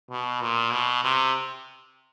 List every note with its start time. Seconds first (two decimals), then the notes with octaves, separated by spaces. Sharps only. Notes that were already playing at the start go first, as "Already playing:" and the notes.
0.11 B2
0.42 A#2
0.72 B2
1.04 C3